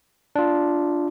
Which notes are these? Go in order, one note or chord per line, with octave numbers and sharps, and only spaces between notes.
D4 F4